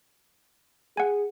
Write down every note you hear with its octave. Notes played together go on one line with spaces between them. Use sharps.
G#4 F#5 G#5